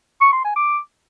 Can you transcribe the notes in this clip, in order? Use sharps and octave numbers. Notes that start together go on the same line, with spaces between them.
C#6
C6
G#5
D6